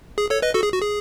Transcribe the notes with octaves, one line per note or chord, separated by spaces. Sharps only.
G#4
A4 C#5
B4 D#5
F#4 A4
G#4
F#4
G#4